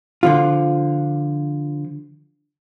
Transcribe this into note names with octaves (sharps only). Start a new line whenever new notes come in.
D3 F3 F4